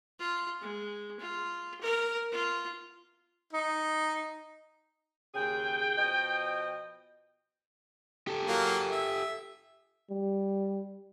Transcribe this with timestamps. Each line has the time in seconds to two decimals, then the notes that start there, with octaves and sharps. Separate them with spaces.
0.19 F4
0.61 G#3
1.20 F4
1.81 A#4
2.32 F4
3.53 D#4
5.34 D#2 C#3 G#4 G5
5.98 B2 F3 D#5
8.27 G4 A4
8.47 F#3 A#3 F4
8.91 E5
10.10 G3